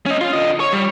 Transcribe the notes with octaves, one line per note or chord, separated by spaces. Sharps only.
C#4 D#5
F4
D3 D#5
C#5
G3